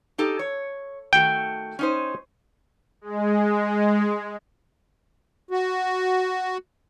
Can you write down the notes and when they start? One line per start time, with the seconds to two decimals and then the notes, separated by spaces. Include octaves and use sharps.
0.18 D#4 G4 A4
0.39 C#5
1.13 D#3 A3 F#4 G5
1.79 C#4 D#4 C5
3.01 G#3
5.51 F#4